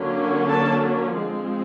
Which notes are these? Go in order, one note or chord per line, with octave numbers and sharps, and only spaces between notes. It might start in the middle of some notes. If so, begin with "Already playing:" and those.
Already playing: D3 F#3 A#3 C#4
A4 A5
F3 G#3 C4